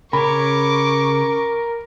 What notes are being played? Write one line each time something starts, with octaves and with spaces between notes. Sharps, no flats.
C#3 A#4 C#5 B5 C#6 D6